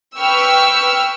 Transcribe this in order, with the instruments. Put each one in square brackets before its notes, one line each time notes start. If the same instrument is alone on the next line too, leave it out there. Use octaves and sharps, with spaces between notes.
[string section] B4 G5 C#6 E6 F6